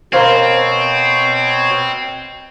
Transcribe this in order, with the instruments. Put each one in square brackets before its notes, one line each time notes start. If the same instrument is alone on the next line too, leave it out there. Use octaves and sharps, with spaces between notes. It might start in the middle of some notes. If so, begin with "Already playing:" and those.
[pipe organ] B2 C#5 G#6 [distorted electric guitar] C4 [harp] A#4 C5 F5